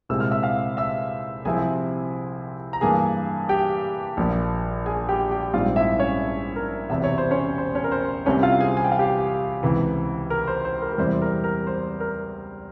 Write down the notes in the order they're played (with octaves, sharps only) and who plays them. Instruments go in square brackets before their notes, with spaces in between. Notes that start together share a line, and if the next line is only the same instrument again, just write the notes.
[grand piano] C2 A#2 G#3 C4 E4 E6
F6
E5 E6
F5 F6
E5 E6
C2 C3 F3 C4 E4 G#4 G#5
A#5
G2 E3 A#3 G#4 G#5
G4 G5
A#1 A#2 F3
G#4 G#5
G4 G5
G4 G5
A#1 G#2 G3 C4 F4 F5
E4 E5
C#4 C#5
A#4
E1 E2 C3 E5
C#5
C5
C#4 C#5
C5
C#4 C#5
A#4
C5
C2 C3 G3 C4 C#4 E4 C#5
F4 F5
G#4 G#5
G#5
G5
F5
G4 G5
C#2 C3 E3
A#4
C5
C5
A#4
A#4
E2 C3 G3 C4 E4 C5
A#4
A#4
C5
A#4